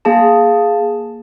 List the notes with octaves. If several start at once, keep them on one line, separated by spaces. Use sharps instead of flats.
A#3 G#4 A5